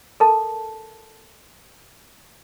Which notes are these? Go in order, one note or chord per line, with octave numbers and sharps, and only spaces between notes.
A4 A#4 A5